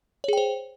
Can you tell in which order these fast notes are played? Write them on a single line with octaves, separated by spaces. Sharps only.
C#5 G#4 G5 C5